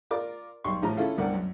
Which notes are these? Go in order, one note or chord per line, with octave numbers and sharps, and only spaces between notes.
F4 A#4 D5 D6
B1 G3 C6 C#6
A1 A2 F3 A#5
C#4 E4 F4 A4
C2 G2 A#4 D5 F#5
F#2